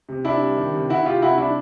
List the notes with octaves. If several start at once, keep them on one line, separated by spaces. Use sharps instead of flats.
C3
C3 D4 E4
G3
D#3
C3
C3 E4 F#4
C3 F4 G4
C3 E4 F#4
G3 D4 E4